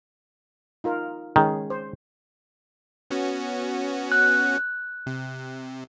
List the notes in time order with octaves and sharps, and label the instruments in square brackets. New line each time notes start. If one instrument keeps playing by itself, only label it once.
[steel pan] D#4 F4 A#4
[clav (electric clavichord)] D#3 [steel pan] G#3 C#4 G#4
[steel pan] C5
[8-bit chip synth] B3 C#4 F#4
[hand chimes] F#6
[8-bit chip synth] C3